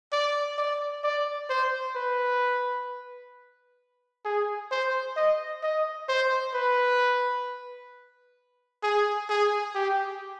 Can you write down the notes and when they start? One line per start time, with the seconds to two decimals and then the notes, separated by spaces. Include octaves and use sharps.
0.12 D5
0.58 D5
1.04 D5
1.50 C5
1.96 B4
4.25 G#4
4.71 C5
5.17 D#5
5.63 D#5
6.09 C5
6.54 B4
8.84 G#4
9.30 G#4
9.75 G4